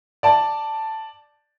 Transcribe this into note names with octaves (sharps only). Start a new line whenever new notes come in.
D5 A5